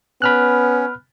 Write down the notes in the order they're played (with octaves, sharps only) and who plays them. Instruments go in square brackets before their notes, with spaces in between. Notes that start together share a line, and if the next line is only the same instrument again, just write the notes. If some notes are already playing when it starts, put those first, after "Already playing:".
[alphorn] B3 [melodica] C#4 [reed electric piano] B5 F6 F#6